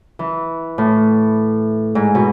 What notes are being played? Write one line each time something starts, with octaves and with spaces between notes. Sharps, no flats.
E3
A2
G#2
B2